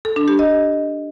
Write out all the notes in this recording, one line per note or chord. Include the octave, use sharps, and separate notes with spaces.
A4
D4
G4
D#5